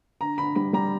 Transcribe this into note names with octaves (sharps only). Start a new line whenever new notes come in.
D3 A#5
D3 B5
G3 B5
G3 A#5